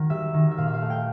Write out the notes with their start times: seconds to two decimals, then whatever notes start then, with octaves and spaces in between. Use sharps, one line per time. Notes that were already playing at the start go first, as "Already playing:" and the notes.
Already playing: D#3 F#3
0.10 G3 E5
0.34 D#3
0.51 E5
0.57 A#2 F5
0.67 E5
0.74 F5
0.82 A3
0.90 G5